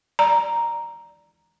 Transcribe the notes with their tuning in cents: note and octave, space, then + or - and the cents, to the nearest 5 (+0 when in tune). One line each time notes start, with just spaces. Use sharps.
D5 +5 A#5 +0